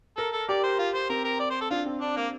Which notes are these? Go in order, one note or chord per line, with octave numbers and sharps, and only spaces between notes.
A4 A#4
A4
G4 D5
C5
F4
C5
C4 A#4
A#4
D5
C5
A4
D4 F4
C4
D4
A#3